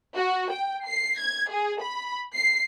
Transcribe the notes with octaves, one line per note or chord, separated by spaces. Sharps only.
F#4
G5
C7
G#6
G#4
B5
C7